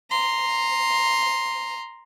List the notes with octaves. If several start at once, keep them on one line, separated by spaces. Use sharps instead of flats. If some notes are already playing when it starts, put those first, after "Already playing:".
A#5 C6